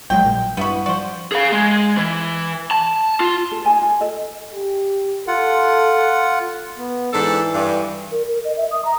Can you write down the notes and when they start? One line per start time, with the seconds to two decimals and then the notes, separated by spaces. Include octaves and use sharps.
0.10 A#1 F#3 G#3 G5
0.23 A#1 A#2
0.57 G2 B3 E4 F#4 B5
0.86 F3 F#4 C5 D5
1.32 G#4 F5
1.52 G#3
1.97 E3
2.71 A5
3.20 F4
3.52 A4
3.64 D#4 G4 G#5 A5
3.82 F4 G#5
4.01 A4 D#5
4.54 G4
5.28 F4 A4 F#5
6.77 B3
7.14 G#2 E3 D4 A4
7.54 G2
8.11 A#4
8.27 A#4
8.44 D#5
8.57 E5
8.71 D#6
8.85 A#5